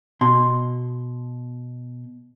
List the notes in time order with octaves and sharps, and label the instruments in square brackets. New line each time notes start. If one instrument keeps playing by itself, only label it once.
[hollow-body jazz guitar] B2 C6